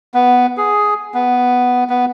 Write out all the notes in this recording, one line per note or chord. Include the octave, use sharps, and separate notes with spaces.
B3
G#4
B3
B3